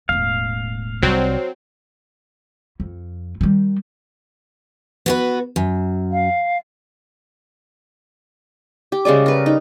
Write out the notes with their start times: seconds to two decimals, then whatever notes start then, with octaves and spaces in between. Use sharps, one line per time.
0.09 E1 A2 F5
1.02 C2 F#3 G3 C4
2.80 F2
3.41 D#3 G3
5.06 B3 F#4 B4
5.56 F#2
6.12 F5
8.92 G4
9.05 C#3 G3 G#3 D5
9.26 A#4 B4
9.46 D#4